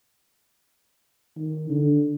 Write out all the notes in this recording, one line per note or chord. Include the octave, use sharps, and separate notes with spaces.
D#3
D3